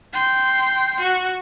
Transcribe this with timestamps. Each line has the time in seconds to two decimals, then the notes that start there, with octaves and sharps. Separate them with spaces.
0.13 G5 C6
1.00 F#4